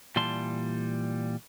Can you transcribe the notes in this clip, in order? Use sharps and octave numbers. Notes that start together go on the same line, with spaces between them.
A#2 E3 G3 A5 C6